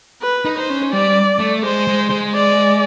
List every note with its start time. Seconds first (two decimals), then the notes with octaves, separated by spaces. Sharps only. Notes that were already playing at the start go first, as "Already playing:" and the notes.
0.22 B4
0.45 D#4
0.58 C5
0.70 C#4
0.93 G3 D5
1.39 A3
1.63 G#3 C5
1.88 G#3
2.10 G#3
2.34 D5